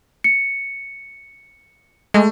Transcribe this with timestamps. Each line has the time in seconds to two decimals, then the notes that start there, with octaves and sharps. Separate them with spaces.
0.24 C#7
2.14 G#3 A3